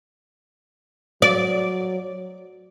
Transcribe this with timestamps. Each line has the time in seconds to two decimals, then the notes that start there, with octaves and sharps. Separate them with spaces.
1.22 F#3 D5